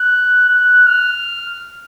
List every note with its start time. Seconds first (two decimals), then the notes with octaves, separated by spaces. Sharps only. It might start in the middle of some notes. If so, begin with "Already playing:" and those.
Already playing: F#6
0.48 F#6
0.87 F6